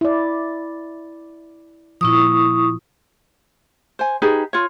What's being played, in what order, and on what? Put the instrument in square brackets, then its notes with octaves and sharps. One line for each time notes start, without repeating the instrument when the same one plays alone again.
[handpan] E4 D5
[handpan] A#2 F3 [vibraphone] E4 C#6 D#6
[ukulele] C5 G#5
D#4 G4 G#4 B4
F4 C#5